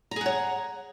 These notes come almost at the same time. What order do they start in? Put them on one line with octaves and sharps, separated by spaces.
A#5 G#4 F#5 C#5